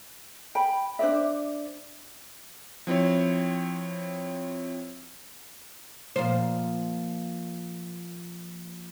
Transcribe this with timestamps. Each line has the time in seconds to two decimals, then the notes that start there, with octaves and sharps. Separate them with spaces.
0.55 G5 B5
0.99 D4 C5 D5 E5
2.87 F3 C4 E4 C#5
6.16 A#2 F3 C5